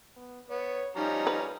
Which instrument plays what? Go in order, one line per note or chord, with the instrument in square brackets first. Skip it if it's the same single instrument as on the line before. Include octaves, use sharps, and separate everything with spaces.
[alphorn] B3
[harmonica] B3 [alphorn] C#5
[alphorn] F3 [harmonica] G3 C#4 A#5 [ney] D#4
[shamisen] B4